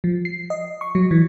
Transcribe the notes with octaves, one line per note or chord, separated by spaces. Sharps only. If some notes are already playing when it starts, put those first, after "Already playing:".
F3
C7
D#5
C#6
F#3
E3